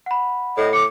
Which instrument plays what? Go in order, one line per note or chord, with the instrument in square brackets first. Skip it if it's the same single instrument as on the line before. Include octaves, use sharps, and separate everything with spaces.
[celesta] F#5 B5
[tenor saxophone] A2 [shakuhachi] D#5
[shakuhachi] D6 [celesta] C#7